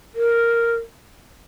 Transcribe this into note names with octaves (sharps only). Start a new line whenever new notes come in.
A#4